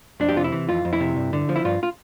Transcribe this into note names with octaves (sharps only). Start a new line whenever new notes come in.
F2 D4
G4
C3 F4
E4
E3
F2 F4
F2
E4
C3
G2
D3
F3
E4
G2 F4
F4